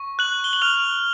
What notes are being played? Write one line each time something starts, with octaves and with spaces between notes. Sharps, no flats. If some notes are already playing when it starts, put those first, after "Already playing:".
Already playing: C#6
F#6 F#7
G7
F#7
F6 F#6 F7